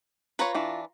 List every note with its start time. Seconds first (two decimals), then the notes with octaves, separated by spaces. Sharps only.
0.39 F4 B4 C#5 A#5 C#6
0.55 E3 D4